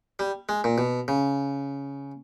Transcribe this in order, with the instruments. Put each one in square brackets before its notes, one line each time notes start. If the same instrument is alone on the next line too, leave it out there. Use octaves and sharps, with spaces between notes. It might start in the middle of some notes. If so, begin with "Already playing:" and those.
[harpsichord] G3
G#3
A#2
B2
C#3